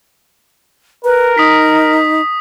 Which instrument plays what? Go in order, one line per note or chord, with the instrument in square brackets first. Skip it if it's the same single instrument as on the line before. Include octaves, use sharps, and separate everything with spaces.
[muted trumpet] A#4 [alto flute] B4
[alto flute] D#4 [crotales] D#6 B6